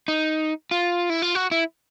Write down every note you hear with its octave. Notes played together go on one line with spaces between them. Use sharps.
D#4
F4
E4
F4
F#4
E4